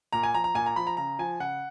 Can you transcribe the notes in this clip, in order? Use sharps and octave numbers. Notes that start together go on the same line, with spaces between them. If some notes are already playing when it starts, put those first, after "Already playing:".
A#2 A#5
G#5
F3 A#5
A#5
A#2 G#5
A#5
F3 B5
A#5
C#3 A#5
F3 G#5
C#3 F#5